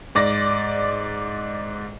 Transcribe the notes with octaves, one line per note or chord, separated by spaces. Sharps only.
G#2 D5 A#6